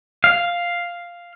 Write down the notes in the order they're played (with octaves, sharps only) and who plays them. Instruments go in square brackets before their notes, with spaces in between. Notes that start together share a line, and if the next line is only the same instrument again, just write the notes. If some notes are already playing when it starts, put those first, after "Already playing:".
[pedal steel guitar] F5